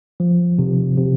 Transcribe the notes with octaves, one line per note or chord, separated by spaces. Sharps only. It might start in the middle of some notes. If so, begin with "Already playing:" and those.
F3
C3
C3